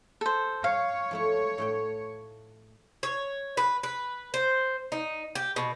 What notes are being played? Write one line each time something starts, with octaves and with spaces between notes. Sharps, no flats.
A4 C5
C#5 F5
F3 A3 E4
A2 A3 G5
C#5
B4
B4
C5
D#4
G4
B2